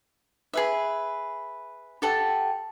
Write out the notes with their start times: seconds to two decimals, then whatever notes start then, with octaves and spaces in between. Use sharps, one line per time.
0.54 G#4 B4 E5
2.02 G4 A4 F#5